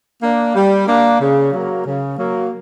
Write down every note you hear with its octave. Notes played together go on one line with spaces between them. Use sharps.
A#3 D4
G3
A#3 D4
C#3
F#3 A#3
C#3
F#3 A#3